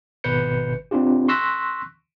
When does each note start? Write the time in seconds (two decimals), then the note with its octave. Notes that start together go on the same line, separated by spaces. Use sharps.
0.24 G#1 B2 B4 G6 C#7
0.91 C4 D4 F4 G4
1.28 C6 C#6 E6 F#6 A#6 B6